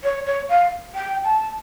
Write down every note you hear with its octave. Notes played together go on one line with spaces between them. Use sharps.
C#5
C#5
F5
G5
A5